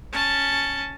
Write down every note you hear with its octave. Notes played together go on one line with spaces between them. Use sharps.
C#4 A5